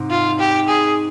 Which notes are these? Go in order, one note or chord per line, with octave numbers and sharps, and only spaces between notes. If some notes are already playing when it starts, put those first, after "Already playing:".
Already playing: G#2 C3
F4
G4
G#4